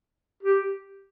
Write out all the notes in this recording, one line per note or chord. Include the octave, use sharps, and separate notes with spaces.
G4